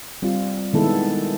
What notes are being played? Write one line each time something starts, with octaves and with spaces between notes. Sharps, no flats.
G3 C4 F4
D#3 G#3 B3 E4 A4